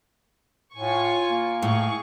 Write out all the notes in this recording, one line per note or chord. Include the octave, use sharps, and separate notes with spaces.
A2 F4 G#5 C#6
A#3
A2 G#4 C#6